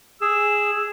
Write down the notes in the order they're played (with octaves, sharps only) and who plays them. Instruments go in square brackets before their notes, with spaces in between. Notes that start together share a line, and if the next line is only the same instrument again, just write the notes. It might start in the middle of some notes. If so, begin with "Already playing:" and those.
[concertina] G#4 [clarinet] E6